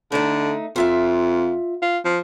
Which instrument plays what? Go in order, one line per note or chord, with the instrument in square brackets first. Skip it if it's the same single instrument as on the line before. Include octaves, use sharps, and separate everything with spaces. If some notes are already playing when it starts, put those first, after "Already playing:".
[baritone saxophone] D3 [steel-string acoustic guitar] A3 D#4
[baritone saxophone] F2 [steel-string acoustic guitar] F4 E5 F5
[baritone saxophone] F4
F3